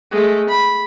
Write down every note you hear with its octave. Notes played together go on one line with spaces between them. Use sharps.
G#3 A3
B5